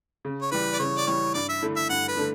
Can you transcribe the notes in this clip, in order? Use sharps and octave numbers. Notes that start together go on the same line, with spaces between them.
C#3
C#5
E3 G3 B4
D5
C#3 C#5
D5
E3 G3 C#5
G2 D5
E5
D3 A3 E4
E5
G2 F#5
B4
D3 A3